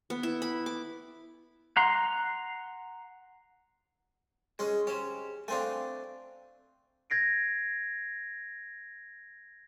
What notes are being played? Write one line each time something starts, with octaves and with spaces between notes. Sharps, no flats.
B3
E4
B5
D6
F#5 A#5 C6
G#3 C#4 G#4
C#4 G4 G#4 C5
A3 C4 D4 F5 G#5
G6 G#6 A#6 C7 D7